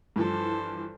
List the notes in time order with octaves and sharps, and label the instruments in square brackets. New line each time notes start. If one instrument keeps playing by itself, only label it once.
[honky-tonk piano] G2 E3 F3 [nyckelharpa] A4 C5